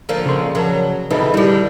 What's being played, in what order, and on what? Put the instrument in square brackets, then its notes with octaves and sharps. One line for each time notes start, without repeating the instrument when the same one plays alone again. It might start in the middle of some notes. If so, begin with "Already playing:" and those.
[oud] D3 F3 A#3
[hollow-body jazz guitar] C#3 C6
[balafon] F3 A#4 A5 [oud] F#3
[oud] E3 [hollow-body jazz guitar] D#4 A4 D#5 [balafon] G#4
[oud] D3 D#3 [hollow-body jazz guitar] G3 [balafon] E4 G4